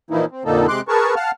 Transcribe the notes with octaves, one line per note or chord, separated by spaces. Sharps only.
A#2 E3 F3 A#3 D#4 E4
C4
F2 A#2 D3 A#3 D#4 A4
C3 G#3 C6 D6 F#6
G#4 A#4 B4 A5 C#6
F5 F#5 A5 F6